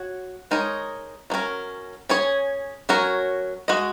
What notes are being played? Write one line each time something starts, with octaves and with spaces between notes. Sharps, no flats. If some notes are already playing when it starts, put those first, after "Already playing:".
Already playing: F#4 C#5
G#3 D#4 A#4 C#5
F#3 A#3 C#4 A#4
C#4 G#4 C#5
F#3 C#4 F#4 A#4 C#5
G#3 F#4 D#5